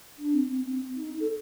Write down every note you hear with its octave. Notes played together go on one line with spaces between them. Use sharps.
D4
C4
C4
C4
D#4
A4